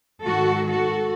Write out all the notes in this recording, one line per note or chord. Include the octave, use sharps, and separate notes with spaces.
G#2 D#3 F#4 A4
F#4 A4